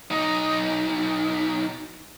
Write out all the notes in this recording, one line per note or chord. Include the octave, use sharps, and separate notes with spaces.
B1 D#4